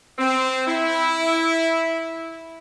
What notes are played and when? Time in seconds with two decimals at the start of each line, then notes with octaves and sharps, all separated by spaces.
0.18 C4
0.67 E4